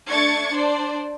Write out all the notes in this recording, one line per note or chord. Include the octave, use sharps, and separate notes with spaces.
A3 D4 C#6 G#6 A6 C#7
D4 C5 D5